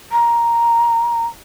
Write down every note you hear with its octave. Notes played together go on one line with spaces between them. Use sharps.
A#5